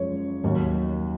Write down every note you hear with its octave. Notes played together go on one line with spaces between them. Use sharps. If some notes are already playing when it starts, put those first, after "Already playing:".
Already playing: F#2 C#3 F3 G#3 C#5
D#2 D#3 F#3